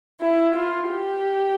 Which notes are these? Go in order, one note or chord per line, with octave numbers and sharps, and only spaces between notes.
E4
F4
G4